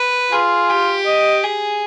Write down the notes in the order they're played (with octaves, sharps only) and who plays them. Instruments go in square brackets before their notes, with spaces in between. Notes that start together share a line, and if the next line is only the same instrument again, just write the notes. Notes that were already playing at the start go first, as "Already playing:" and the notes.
Already playing: [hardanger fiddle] B4
[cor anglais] F4 [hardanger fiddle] G#4
[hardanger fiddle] G4
[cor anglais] D#5
[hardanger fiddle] G#4